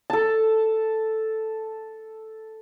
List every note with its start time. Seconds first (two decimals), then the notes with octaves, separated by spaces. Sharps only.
0.10 A4 A5